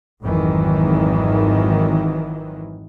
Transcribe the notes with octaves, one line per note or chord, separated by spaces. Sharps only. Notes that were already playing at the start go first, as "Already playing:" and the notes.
G#1 F2 D#3 E3 F#3